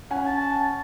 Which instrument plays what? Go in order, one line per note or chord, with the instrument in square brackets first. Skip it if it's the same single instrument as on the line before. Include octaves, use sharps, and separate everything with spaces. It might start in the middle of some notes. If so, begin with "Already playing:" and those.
[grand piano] C#4 F#5 G#5
[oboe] A5